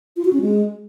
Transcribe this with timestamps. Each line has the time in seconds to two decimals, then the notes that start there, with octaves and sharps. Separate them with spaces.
0.17 F4
0.25 F#4
0.33 C#4
0.41 G#3